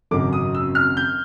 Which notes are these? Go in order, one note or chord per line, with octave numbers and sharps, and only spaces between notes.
G#1 F#2 C#3 F#3 D6
D#6
E6
F6
G6